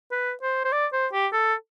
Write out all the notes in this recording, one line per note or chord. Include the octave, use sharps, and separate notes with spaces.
B4
C5
C5
D5
C5
G4
A4